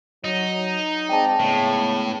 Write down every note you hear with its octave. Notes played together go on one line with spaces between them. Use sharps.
F#3 D#4
G#3 C4 D5 G5 A5
A2 C#3 G#3 B3